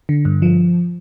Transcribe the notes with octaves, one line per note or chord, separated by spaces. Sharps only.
D3
G2
F3